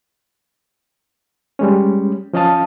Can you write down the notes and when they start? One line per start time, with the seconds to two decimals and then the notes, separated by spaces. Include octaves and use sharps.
1.59 G3 G#3 C#4
2.33 F3 C#4 D#5 F5 A5 D#6